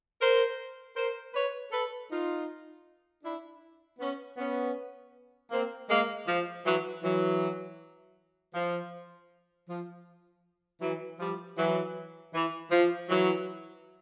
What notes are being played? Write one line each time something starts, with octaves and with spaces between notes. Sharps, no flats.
A#4 C5
A#4 C5
B4 C#5
A4 B4
D#4 F4
D4 E4
B3 C#4
B3 C#4
A#3 C4
G#3 A#3
F3
E3 F#3
E3 F#3
F3
F3
E3 F#3
F3 G3
E3 F#3
E3
F3
E3 F#3